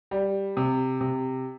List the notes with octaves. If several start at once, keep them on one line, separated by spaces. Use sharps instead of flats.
G3
C3
C3